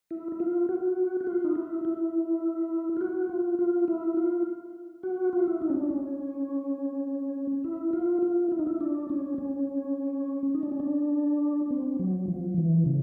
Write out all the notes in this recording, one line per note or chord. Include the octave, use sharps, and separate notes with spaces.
E4
E4
F4
F#4
F#4
F4
D#4
E4
E4
F4
F#4
F4
F4
E4
F4
F#4
F4
E4
D#4
C#4
D4
C#4
E4
F4
F4
E4
D#4
E4
D4
C#4
C#4
D#4
D4
C#4
D4
C4
F#3
F3
E3
C#3